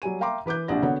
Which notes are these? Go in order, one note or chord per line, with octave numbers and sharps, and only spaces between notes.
F#3 G3 G#5 D#7
E5 F5 G5 A#5 C6 D6
E3 B4 D6 F#6 G6
A#1 C3 D4 D5 F#5 A#6
D3 B3 F#4 C#5 F#5